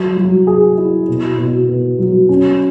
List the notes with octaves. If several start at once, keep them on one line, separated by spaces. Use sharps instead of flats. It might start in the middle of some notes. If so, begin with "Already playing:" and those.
Already playing: F#3
F#3
G#4
E4
B2
B2
B3
F#3
C#4